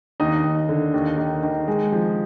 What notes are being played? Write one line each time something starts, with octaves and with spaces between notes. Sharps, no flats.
D#2 D#4 D#5
D#2
D3
D#2
D#3
D#3
G#3
F3